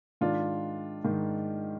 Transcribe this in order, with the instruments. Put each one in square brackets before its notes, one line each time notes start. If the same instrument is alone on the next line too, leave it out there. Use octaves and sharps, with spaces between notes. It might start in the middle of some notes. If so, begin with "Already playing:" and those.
[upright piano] G#2 D#3 D4 F4
G#2 D#3